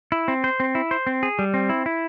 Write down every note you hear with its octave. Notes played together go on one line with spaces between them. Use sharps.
E4
C4
C5
C4
E4
C5
C4
G#4
G3
C4
E4
E4